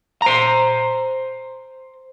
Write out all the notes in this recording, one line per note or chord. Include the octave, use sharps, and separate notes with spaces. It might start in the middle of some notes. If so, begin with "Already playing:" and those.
C5 A#5